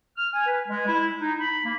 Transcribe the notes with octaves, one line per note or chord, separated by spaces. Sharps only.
F6
G#5
B4
G#3
E4
D#4
B5
A#3